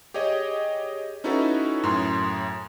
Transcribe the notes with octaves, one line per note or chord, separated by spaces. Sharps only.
G4 G#4 C#5 D#5
C#4 D#4 E4 F#4 A4 B4
F#2 A2 C6